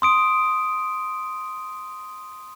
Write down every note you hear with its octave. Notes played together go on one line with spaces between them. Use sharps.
C6 D#6 D7